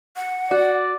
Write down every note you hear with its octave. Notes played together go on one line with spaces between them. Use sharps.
F#5
F#4 D5